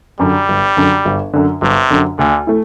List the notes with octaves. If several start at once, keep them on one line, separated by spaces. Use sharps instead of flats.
F#2 D3 G3
G1
F#2 D3
G1
F#2 D3
G1 C3
F#2 D3
D2 D3
A3 E4